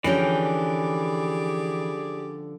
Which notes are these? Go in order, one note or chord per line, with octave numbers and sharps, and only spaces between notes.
D3 E3 F3 C#4 G4 G#4 D5 G5